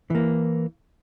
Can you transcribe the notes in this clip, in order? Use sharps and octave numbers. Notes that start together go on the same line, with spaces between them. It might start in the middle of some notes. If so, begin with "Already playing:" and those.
E3 A#3